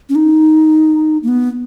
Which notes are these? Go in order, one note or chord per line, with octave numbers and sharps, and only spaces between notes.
C#4
D#4
A#3
B3